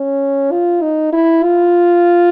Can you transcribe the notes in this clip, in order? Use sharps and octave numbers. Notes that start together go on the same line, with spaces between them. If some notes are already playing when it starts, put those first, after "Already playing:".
Already playing: C#4
F4
D#4
E4
F4